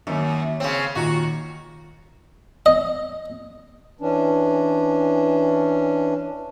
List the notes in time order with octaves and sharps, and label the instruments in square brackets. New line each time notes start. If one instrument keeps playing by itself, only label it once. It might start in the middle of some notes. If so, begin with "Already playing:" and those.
[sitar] F#2 [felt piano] D#3 A#3
[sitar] C#3 C4 [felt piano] C#5
[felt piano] A#2 D#3 A#5 [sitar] F#4
[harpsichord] D#5
[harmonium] E3 C#4 D4